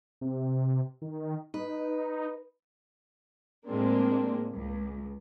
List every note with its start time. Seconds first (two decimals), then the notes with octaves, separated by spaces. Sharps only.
0.21 C3
1.02 D#3
1.54 D#4 B4
3.68 A2 G#3 A#3 C4 D4
4.54 C#2